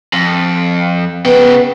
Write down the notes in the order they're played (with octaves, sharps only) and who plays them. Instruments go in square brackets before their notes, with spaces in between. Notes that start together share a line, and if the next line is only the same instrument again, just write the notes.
[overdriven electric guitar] F2
[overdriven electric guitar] C#3 G5 [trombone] B3